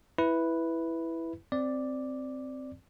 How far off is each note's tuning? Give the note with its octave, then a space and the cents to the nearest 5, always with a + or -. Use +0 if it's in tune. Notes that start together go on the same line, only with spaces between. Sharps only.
E4 +0 B4 +0
C4 +0 D5 +0